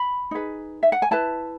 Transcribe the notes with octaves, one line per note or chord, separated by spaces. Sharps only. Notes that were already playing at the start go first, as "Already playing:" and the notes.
Already playing: B5
D#4 G#4 B4
E5
F#5
G#5
E4 B4 A5